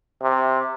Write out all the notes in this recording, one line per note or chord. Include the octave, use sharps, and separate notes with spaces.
C3